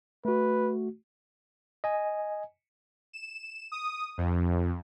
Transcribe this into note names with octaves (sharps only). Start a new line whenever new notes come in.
A3 F#4 B4
D#5 G#5
E7
D#6
F2